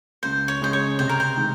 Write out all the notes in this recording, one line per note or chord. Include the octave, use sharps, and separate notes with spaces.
C#2 C5
C#5
C#3 G#3 C#4 G#4 C5
C#5
C3 C5
A#4
C5
D#3 G#3